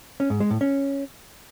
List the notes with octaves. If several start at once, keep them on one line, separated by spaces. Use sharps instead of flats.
C#4
G#2
G#3
A2
C#4